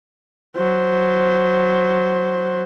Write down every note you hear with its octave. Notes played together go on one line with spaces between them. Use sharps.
F#3 C5